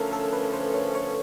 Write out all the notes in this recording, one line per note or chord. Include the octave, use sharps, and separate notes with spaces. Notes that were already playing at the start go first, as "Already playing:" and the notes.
Already playing: D3 F3 A3 C#4 A4 A#4
A4
B4
C5
C#5
C#5